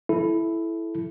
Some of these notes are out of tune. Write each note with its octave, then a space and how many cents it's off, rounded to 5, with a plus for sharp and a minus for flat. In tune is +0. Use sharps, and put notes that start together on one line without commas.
E4 +0 A4 -20